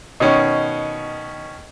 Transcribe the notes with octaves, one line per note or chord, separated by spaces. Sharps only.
B2 D#3 C#4